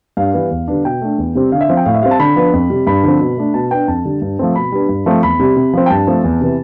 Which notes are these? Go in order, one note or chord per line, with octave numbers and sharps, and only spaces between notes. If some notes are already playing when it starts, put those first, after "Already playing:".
G2 F5
E3 G3 B3
E2
D3 G3 B3 D4
B2 G5
A3 D4
E2
C3 G3 C4
D3 F5
E5
F3 C4 F5
G5
A2 F5
E5
G3 C4 F5
A5
D3 B5
F3 B3 D4
F2
C3 G3
G2 B5
D3 F3 C4
B2
A3 D4
B2 A5
B3 D4 G5
F2 A5
D3 G3
G2
F3 A3 C4
B2 B5
G3 B3 D4
G2
F3 A3 C4
E2 B5
C3 G3
C3
F3 C4
G5
G2 A5
F3 A3 C4
E2
C3 E3 B3